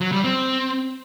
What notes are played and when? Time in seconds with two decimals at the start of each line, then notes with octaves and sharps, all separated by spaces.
0.01 F#3
0.12 G3
0.24 C4